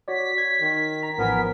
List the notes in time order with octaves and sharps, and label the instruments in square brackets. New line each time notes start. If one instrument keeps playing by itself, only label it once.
[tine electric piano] F#4 C#5 D5 [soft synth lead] B6
[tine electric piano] G#6
[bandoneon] D#3
[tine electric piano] A#5
[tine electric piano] A1 F3 G#5 [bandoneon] B3 A#4